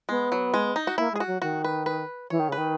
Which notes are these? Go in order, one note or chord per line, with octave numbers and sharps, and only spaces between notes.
G#3 B3
F#3
G#3
D#4
F#4
A#3 E4
G#3 G#4
F#4
F#3
D#3 F#4
B4
B4
E3 C#5
D#3
C#3 B4
D#3